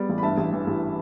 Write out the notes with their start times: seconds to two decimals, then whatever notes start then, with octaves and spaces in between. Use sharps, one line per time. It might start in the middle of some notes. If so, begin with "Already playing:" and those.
Already playing: G3 B3 D5
0.09 A1
0.18 B5
0.23 G2 E5 A5
0.38 A1
0.53 E3
0.67 A1